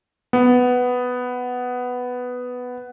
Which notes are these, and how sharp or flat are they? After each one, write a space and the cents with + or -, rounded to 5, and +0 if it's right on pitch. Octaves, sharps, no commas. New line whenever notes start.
B3 +5